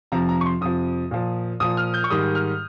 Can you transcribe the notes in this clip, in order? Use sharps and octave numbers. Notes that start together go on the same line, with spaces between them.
F2 C3 F3 A#5
A#5
C#6
C6
F2 C3 F3 D#6
A#2 F3
A#2 F3 D#6
F6
G6
C#6
G#2 D#3 G3 D#6
F6